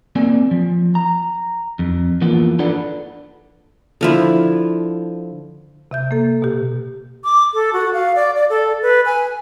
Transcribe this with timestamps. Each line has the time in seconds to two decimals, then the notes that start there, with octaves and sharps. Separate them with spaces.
0.16 A#3 C4 D5 G#5
0.51 F3
0.95 A#5
1.79 F2
2.21 E3 F3 A#3 B3 F4
2.59 D4 F4 A4 B4 D5 F#5
4.01 D3 F3 E4
5.91 C3 E5 G6
6.11 A#3 A4
6.42 B2 G4
7.24 D6
7.54 A4
7.73 F#4
7.93 F5
8.16 D5
8.36 D5
8.50 A4
8.83 B4
9.06 G#5